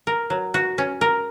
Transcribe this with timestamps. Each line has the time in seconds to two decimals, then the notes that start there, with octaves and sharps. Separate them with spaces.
0.07 A#4
0.30 F#3
0.54 F#4
0.78 C#4
1.01 A#4